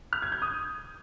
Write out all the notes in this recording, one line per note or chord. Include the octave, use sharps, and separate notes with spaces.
F6
G#6
G6
D#6